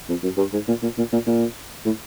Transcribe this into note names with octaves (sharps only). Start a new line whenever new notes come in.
F2
F#2
G2
G#2
A#2
A#2
A#2
A#2
A#2
A2